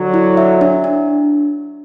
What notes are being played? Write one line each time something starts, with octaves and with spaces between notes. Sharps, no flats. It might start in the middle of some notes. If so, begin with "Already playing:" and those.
Already playing: D3 F#3
E4
E5
D4
D4